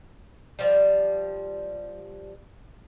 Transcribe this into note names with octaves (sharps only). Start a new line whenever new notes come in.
F3 G3